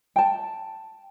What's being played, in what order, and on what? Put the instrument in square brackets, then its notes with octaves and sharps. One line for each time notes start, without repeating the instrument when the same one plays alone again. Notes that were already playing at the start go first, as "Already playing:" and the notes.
[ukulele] G5 A5